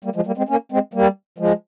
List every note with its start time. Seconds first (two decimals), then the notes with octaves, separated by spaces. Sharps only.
0.04 G3 A#3
0.16 F3 G#3
0.26 G3 A#3
0.38 G#3 C4
0.49 A#3 C#4
0.72 G#3 C4
0.94 G3 A#3
1.38 F3 G#3